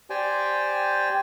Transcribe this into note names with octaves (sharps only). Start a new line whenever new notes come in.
G4 C5 D5 G5 G#5